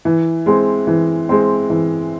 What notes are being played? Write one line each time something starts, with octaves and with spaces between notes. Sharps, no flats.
E3
G#3 C4
E3
G#3 C4
E3